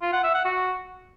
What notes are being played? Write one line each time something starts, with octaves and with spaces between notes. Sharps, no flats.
F4
F#5
E5
F#5
F#4